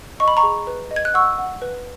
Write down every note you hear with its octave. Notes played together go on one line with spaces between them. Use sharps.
D#5 C#6
B5
A#5 C#6
G#4
B4
D#5
G#6
F#6
F#5 C#6 E6
F#5
B4